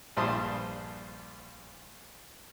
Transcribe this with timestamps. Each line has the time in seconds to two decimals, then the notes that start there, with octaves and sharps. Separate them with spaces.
0.17 A#1 G2 C5 A5 C6 D#6